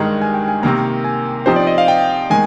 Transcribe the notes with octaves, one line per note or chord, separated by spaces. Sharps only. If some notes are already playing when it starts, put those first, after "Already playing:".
Already playing: G2 D#3 G#3 A#5
G#5
G5
G#5
C3 D#3 A#3 A#5
G#5
F3 C4 D#4 G4 C5
D5
D#5
F5
G5
D#3 G#3 G#5